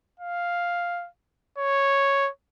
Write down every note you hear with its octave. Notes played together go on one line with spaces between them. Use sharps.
F5
C#5